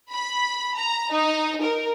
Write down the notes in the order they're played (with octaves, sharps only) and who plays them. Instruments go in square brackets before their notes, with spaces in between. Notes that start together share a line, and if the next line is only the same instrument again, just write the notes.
[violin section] B5
A#5
D#4
A#4